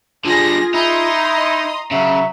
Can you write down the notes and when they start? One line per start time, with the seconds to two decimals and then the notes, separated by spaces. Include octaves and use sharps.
0.25 D3 G3 F4 G#4 A#6
0.74 D#4 E4 A#5 C6 D#6
1.37 D#5
1.91 C#3 F#3 E5